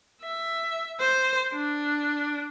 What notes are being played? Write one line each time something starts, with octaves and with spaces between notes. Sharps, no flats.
E5
C5
D4